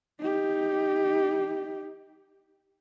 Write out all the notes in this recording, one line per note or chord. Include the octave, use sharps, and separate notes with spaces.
D#4 G4